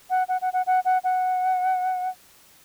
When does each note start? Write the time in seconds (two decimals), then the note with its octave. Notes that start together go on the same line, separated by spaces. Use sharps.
0.10 F#5
0.28 F#5
0.42 F#5
0.53 F#5
0.67 F#5
0.85 F#5
1.04 F#5